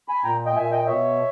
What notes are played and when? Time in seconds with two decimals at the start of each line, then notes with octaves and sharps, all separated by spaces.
0.08 G#5 B5
0.24 A#2 G5 A#5
0.46 D#5 G5
0.56 A#2 E5 G#5
0.71 D#5 G5
0.84 D#5
0.87 B2 C#5 E5